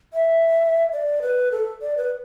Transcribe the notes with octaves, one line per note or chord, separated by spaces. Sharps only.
E5
D5
B4
A4
D5
B4